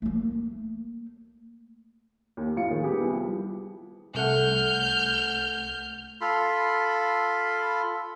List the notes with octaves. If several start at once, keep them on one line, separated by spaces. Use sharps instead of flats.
A3 A#3
D#2
F2 A2 F4 C#7
D#3 G#4
G3 B3 G4 G#4
C2 F3
C2 A3 F#5 F6 G6
F4 A4 B5 C6